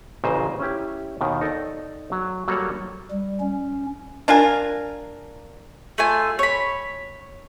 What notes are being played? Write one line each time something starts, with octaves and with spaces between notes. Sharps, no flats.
A1 A#2 C#3 C5 D#5
C#4 E4 G4
D#2 B2 D#3
D#4 A4 D5 D#5
F#3
F#3 G3 A#3 A4 C#5 F#5
G3
C#4
D4 F4 A#4 G#5
A3 F4 G#5
C#5 B5